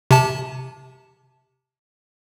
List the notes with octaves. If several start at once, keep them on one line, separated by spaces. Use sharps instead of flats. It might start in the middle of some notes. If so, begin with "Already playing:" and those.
C3 A5